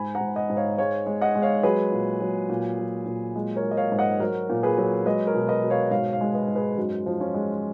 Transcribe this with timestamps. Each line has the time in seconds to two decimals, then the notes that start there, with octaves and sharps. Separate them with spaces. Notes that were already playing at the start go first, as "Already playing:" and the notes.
Already playing: G#2 G#5 B5
0.15 F#5 A#5
0.21 G#2
0.36 D#5 F#5
0.50 G#2
0.57 C#5 F5
0.78 G#3 C#5 F5
1.06 G#3
1.21 D#5 F#5
1.35 G#3
1.42 C#5 F5
1.63 F#3 G#4 B4
1.92 A#2
2.21 F#3
2.50 A#2
2.79 F#3
3.06 A#2
3.36 G#3
3.56 A#4 C#5
3.63 G#3
3.71 D#5
3.77 C#5 F5
3.92 G#2
3.99 D#5 F#5
4.20 F#3 F#4 A#4
4.49 A#2
4.63 G#4 B4
4.78 F#3
5.06 G#3 B4 D#5
5.27 A#4 C#5
5.34 B2
5.49 B4 D#5
5.63 B2
5.70 C#5 F5
5.91 G#2 C#5 F5
6.13 C#5 F5
6.21 G#3
6.34 B4 D#5
6.48 G#2
6.55 G#4 B4
6.77 F#2 D#4 F#4
7.06 F3
7.20 C#4 F4
7.34 G#3